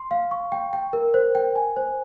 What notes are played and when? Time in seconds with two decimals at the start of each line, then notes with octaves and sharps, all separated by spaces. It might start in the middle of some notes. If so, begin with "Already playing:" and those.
Already playing: C6
0.11 F5
0.31 C#6
0.52 G5
0.73 G5
0.93 A#4
1.14 C5
1.35 G5
1.56 G#5
1.76 C5